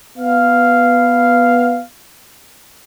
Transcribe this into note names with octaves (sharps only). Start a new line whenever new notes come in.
B3 F5